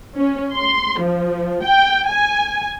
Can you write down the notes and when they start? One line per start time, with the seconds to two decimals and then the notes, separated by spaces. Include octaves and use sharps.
0.16 C#4
0.53 C6
1.01 F3
1.63 G5
2.10 G#5